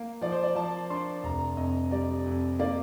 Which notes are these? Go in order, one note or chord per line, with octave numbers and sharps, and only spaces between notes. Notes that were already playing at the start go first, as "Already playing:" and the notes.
Already playing: A#3
F3 D5
C5
D5
F3 A5
D4 C6
F1 A#5
F2 D#5
G3 D5
F2
A#3 D5